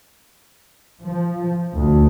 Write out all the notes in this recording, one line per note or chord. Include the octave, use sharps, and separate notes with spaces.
F3
D2